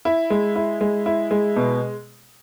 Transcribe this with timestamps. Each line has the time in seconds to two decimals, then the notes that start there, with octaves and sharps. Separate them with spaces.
0.05 E4
0.30 G#3
0.56 E4
0.81 G#3
1.06 E4
1.31 G#3
1.56 B2